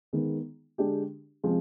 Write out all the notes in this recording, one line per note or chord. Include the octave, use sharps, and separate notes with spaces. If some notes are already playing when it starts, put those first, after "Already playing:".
D#3 G#3 B3
D3 G#3 D4 G4
C3 F3 G#3 C4